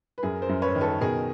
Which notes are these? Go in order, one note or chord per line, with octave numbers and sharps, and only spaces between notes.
B4
F#2 G#4 A#4
A#4 C5
F#2
B4 C#5
D#3
A4 B4
B2 G#4 A#4